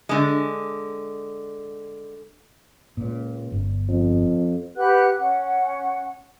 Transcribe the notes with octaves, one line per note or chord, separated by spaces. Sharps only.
D3 G#3
C#2 A#2
G1
F2
G4 B4 F#5 F#6
C#4 F#5